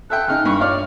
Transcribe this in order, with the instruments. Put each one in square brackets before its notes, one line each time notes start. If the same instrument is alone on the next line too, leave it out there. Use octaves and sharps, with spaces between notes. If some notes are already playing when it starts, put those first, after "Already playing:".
[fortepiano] A4 E5 G5 [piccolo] F#6
[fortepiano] C#3 D#4 [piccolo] F6
[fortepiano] G2 [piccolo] C#6
[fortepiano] F4 C#5 D5 [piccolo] F6